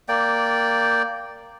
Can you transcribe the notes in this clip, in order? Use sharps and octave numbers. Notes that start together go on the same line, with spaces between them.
A#3 D5 G5